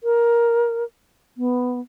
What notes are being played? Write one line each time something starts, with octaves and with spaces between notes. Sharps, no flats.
A#4
B3